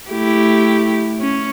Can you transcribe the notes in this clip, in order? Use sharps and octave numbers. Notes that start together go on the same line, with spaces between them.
A3 E4 G4
C#4